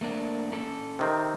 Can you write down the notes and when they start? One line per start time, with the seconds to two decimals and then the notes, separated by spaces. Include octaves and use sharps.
0.01 A3 A#3 D4
0.52 C#4 A4
0.99 C3 D#3 C4